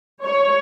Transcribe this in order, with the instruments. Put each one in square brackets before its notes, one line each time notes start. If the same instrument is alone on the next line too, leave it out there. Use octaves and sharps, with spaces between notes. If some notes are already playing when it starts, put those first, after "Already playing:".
[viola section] C#5